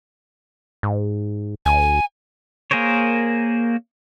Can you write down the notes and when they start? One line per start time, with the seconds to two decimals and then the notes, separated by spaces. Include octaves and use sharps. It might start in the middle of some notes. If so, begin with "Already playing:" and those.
0.83 G#2
1.66 D2 G#5
2.71 A#3 G#4 A#4 C5 C#5